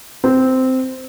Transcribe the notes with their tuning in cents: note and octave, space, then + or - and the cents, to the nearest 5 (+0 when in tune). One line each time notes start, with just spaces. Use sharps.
C4 -10